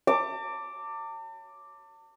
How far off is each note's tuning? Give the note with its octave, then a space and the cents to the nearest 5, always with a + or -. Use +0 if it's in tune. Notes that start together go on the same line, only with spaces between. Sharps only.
A5 +40 D6 +0